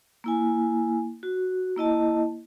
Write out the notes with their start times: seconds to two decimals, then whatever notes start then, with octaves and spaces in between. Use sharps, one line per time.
0.24 A#3 E4 G#5
1.23 F#4
1.77 A#3 E4 D#5 A5